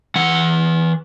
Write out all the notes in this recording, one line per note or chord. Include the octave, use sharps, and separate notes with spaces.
E3 F#5